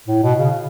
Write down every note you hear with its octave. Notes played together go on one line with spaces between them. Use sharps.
A2
B2
C#3